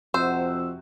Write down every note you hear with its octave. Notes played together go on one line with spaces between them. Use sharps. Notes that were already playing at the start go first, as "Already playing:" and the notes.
F2 C3 C4 F#4 C5 E6